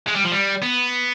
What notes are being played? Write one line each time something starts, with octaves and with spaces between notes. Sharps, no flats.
G#3
G3
F3
G3
B3